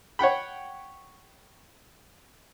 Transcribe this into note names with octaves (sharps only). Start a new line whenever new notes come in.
C#5 F#5 G5 B5